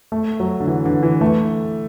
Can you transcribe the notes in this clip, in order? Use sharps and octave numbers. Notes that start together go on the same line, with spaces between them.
A3
F#3
D3
E3
D3
E3
A3